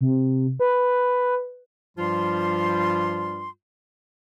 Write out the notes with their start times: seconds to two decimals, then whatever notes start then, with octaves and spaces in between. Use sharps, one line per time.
0.01 C3
0.60 B4
1.98 G2 F3 G3 F4 C6